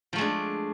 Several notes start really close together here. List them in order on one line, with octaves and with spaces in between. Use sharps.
F3 A3 G#3 D4